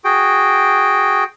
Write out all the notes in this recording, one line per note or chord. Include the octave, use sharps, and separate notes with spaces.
F#4 G#4 G5